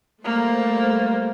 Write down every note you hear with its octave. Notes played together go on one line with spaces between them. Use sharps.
G3 A3 A#3 C5